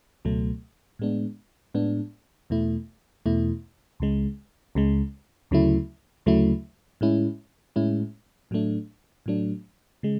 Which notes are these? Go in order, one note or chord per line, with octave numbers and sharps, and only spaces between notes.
C#2 B2 F#3 A3
A2 G#3 B3 D4
A2 G#3 B3 D4
E2 B2 A3 E4
E2 B2 A3 E4
C#2 C#3 G#3
C#2 C#3 G#3
D2 C#3 F#3 A3 E4
D2 C#3 F#3 A3 E4
A2 G#3 C#4 E4
A2 G#3 C#4 E4
A2 F#3 A3 D4
A2 F#3 A3 D4
C#3 G#3